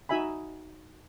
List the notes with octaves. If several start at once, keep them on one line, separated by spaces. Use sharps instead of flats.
D#4 F#4 E5 G#5 B5